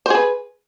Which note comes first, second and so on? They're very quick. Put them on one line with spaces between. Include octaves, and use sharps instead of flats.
C5 G#4 B4